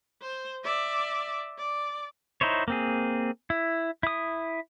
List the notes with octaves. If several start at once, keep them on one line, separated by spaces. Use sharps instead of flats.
C5
D5 E5
D5
D#4 E4 C5 C#5
A#3 C4 G#4
E4
E4 D#6